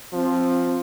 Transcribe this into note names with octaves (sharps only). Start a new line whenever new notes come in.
F3 C4